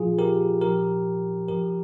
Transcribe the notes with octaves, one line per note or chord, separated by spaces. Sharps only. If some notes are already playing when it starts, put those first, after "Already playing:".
Already playing: A#2 F3 F4 G#4
G4 A#4
A#2 F3 G4 A#4
G2 F3 G4 A#4